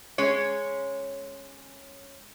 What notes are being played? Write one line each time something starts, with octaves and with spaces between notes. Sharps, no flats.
G#3 C#4 C#5